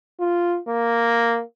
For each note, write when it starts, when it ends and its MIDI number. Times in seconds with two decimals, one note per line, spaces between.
0.20 0.58 65
0.68 1.42 58